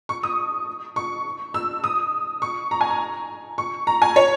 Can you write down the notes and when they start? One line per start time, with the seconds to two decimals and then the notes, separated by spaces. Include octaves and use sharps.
0.09 C#6
0.23 D#6
0.96 C#6
1.54 E6
1.84 D#6
2.42 C#6
2.71 A#5
2.81 G#5
2.90 A#5
3.58 C#6
3.87 A#5
4.02 G#5
4.16 C#5